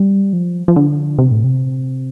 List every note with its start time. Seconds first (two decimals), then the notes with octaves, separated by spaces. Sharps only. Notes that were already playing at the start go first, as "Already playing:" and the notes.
Already playing: G3
0.33 F3
0.68 F3
0.76 D3
1.19 C3
1.31 A2
1.44 C3